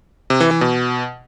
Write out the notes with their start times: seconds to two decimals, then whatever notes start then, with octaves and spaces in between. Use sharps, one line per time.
0.30 C3
0.40 E3
0.51 E3
0.61 B2